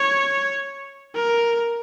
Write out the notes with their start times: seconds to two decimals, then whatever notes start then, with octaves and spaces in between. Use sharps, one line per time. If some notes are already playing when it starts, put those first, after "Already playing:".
Already playing: C#5
1.15 A#4